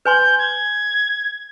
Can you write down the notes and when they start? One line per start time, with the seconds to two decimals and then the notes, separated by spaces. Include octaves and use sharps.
0.05 B4 G#5 C6 G6
0.39 G#6